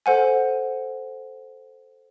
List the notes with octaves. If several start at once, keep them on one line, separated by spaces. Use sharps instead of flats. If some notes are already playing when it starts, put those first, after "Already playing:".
A4 C5 F#5 G#5